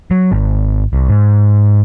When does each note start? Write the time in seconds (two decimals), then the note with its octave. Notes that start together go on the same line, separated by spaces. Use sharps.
0.11 F#3
0.32 G#1
0.93 C2
1.09 G#2